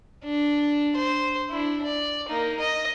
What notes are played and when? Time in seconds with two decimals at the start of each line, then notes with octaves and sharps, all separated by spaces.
0.24 D4
0.97 C5
1.50 D4 E4
1.85 D5
2.28 A#3 D#4
2.60 D#5